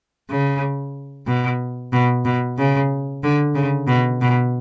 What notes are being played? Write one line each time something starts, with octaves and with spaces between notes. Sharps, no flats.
C#3
B2
B2
B2
C#3
D3
C#3
B2
B2